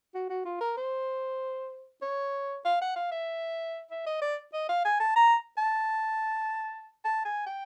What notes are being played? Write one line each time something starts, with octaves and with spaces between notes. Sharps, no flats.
F#4
F#4
F4
A#4
C5
C#5
F5
F#5
F5
E5
E5
D#5
D5
D#5
F5
G#5
A5
A#5
A5
A5
G#5
G5